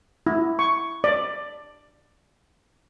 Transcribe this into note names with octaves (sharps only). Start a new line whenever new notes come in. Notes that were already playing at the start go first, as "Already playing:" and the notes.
E4
C#6
D5